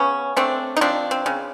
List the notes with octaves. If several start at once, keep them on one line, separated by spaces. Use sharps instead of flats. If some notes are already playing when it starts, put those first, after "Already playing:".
Already playing: C#3 B3 C#4
A3 C4 D4
D#4
F3 C4 D4
C4
C#3